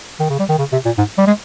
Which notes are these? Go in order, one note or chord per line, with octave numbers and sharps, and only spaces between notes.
D#3
C#3
G3
D#3
C#3
C3
A#2
G#2
G3
G#3